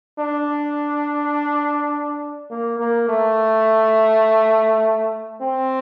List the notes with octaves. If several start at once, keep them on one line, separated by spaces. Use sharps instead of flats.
D4
A#3
A#3
A3
C4